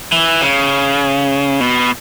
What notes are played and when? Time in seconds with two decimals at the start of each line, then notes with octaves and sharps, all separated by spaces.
0.12 E3
0.41 C#3
1.60 B2